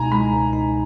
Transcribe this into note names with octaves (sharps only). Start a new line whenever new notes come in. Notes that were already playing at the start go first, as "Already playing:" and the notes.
Already playing: C#2 B2 D#4 G#5 A#5
G#3 B5
C#2
D#4